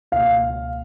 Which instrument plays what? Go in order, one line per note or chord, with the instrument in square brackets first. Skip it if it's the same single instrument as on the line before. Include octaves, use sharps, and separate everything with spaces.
[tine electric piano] C#2 B2 A#3 [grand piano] F5